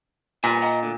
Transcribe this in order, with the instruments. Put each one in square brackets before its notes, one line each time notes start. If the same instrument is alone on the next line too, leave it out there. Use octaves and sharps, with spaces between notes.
[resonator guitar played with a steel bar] A#2 [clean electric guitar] G3 B3 G#5
[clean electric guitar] D#5 F#5 A#5
D2 D3